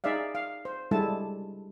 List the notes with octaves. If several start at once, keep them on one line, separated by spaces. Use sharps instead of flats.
D#4 G#4 D5 E5 F5
F5
C5
G3 G#3 D4 E4 A4 A5